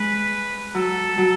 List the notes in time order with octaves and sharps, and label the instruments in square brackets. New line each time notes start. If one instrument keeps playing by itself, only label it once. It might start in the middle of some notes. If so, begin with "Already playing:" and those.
Already playing: [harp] G#3 [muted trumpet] B4
[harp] F#3 [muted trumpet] A4
[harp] F#3